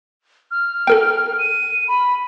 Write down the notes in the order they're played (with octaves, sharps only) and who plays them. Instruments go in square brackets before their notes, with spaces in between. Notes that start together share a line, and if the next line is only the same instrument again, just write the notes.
[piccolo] F6
[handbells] A4 A#4 G5
[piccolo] D#7
B5